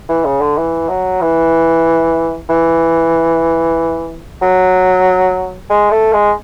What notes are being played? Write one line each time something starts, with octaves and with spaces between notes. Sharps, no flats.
E3
C#3
D3
E3
F#3
E3
E3
F#3
G#3
A3
G#3